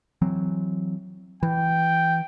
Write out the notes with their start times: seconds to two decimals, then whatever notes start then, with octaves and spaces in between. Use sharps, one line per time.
0.22 E3 F#3 C4
1.43 E3 G5